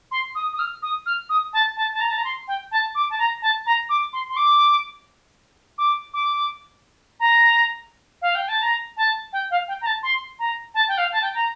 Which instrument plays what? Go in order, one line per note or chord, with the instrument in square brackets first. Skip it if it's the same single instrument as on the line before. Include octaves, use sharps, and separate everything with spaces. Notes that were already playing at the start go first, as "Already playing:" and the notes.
[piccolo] C6
D#6
D#6
F6
D#6
F6
D#6
A5
A5
A5
A#5
A5
A#5
C6
G5
A5
D6
A5
A#5
A5
A#5
D6
C6
C6
D6
D6
D6
A#5
F5
G5
A5
A#5
A5
G5
F5
G5
A#5
A5
C6
A#5
A5
G5
F5
A5
G5
A#5